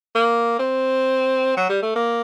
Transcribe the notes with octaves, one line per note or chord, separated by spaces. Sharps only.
A#3
C4
F#3
G3
A3
A#3